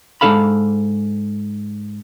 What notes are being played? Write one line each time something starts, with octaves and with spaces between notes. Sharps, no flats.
G#2 G#3 D4 A4 F5 B5